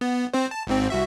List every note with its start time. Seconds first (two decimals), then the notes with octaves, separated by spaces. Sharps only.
0.01 B3
0.34 C4 C5
0.51 A5
0.67 G#1 G#2 C4
0.90 C2 F#4 E5